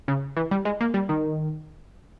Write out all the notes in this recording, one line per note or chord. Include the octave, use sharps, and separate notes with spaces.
C#3
E3
G3
G#3
A#3
G3
D#3